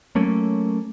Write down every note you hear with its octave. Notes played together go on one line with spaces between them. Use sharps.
F#3 A3 A#3 C#4